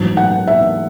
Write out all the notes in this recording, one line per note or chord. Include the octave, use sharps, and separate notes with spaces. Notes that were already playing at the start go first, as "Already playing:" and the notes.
Already playing: A1 G#2 F#3
F#5
E5